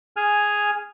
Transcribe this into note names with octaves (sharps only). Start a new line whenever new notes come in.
G#4 G#5 F6